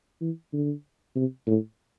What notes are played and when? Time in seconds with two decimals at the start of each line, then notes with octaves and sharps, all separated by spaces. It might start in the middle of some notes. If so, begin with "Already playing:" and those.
0.21 E3
0.53 D3
1.16 C3
1.47 A2